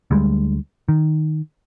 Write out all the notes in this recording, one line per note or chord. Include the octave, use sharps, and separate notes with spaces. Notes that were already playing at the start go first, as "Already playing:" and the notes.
D2 G3 G#3
D#3